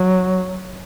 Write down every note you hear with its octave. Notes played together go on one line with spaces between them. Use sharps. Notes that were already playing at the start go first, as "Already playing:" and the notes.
Already playing: F#3